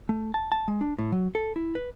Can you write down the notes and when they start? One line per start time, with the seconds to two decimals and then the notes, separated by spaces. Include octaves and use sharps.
0.09 A3
0.34 A5
0.52 A5
0.68 G#3
0.81 D4
0.99 A2
1.12 F#3
1.35 A4
1.56 E4
1.75 B4